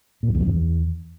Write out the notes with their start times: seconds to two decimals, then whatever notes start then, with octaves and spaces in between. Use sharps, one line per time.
0.23 A#2
0.29 F2
0.35 E2
0.40 F#2
0.46 E2